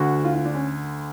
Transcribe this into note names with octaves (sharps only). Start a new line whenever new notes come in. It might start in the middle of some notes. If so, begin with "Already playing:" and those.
Already playing: D2 D3 F#4
F4
F4
D4
C#4